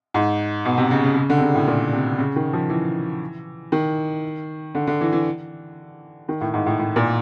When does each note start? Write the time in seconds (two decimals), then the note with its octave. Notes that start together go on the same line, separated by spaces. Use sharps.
0.14 G#2
0.65 B2
0.78 C3
0.91 C#3
1.04 C#3
1.16 C#3
1.30 D3
1.38 C3
1.42 C#3
1.55 A2
1.67 A#2
1.93 C3
2.19 C#3
2.36 D#3
2.53 F3
2.69 E3
3.72 D#3
4.75 D3
4.87 D3
5.01 E3
5.13 E3
6.29 D#3
6.41 A2
6.54 G#2
6.66 A2
6.79 A2
6.96 A#2